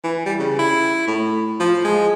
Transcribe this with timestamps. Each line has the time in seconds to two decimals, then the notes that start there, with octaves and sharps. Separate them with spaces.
0.04 E3
0.26 G3
0.40 C#3
0.59 E4
1.08 A2
1.60 F3
1.84 G#3